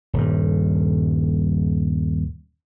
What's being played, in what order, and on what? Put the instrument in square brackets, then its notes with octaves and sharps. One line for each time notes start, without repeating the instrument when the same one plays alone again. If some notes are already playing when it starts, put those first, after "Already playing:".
[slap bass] D#1 G2